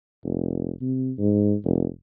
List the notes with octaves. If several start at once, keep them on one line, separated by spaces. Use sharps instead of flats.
F1
C3
G#2
F1